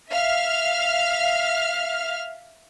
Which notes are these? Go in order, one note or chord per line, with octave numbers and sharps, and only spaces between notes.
E5 F5 F6